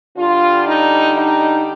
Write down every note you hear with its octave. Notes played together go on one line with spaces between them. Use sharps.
D3 G3 D4 F4
D#4
D#4